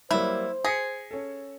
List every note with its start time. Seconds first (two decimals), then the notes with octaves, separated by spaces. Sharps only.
0.11 F#3 G3 A#3 E4 C5
0.65 G#4 A#6 B6 C#7
1.11 C#4 A4